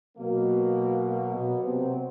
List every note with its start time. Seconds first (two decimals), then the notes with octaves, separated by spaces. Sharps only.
0.17 B2 F#3 A#3
1.05 A#3
1.35 B2 B3
1.64 C3 C4